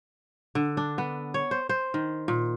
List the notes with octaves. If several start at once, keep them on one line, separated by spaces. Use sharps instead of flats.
D3
D4
B3
C#5
C5
C5
D#3
A#2